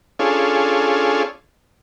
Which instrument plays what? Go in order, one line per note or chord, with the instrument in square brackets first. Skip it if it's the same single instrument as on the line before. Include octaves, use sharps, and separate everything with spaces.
[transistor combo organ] C#4 D4 F4 G#4 A4